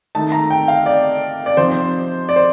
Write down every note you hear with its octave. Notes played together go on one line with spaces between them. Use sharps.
D#3 A3 D#4 A5
A#5
G5
F5
D5
D5
C3 F3 C4 D#4 C5
D5
C5